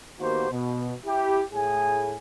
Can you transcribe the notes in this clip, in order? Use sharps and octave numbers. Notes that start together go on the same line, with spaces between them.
D#3 A#3 B3 F#4 G4 C5
B2
E4 G4
A2 G#4 G#5